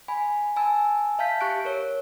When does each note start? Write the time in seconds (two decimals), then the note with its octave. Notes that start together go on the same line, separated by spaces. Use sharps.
0.08 G#5 B5
0.56 G#5 A5 E6
1.19 E5 F5 A5 G6 B6
1.41 G4 C#6 F#6 D7
1.65 A#4 C#5